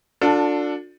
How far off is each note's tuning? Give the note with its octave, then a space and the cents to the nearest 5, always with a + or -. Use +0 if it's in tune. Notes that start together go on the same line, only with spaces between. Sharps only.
D4 +0 F4 +45 A4 +15